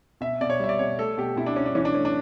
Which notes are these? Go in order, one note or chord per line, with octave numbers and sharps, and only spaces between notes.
B2 E5
B2 D5
C#5
G3 E5
D5
B2 C#5
A3 A4
B2 G4
B2 E4
D4
B2 C#4
D4
E3 C#4
D4
A3 C#4
D4